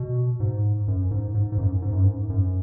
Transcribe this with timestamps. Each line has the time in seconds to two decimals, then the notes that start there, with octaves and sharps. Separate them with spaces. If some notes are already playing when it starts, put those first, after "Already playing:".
Already playing: B2
0.40 G#2
0.88 F#2
1.11 G#2
1.35 G#2
1.52 G#2
1.58 F#2
1.82 G#2
1.93 F#2
2.04 G#2
2.30 F#2